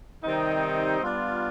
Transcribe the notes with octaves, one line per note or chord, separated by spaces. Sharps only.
C3 D#3 G3 C4 D#4
G3 B3 D4 F4